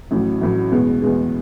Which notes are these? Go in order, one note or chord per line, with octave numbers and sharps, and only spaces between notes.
A1 A2 F#3
A1 A2 F#3
E2 B2 G#3
E2 B2 G#3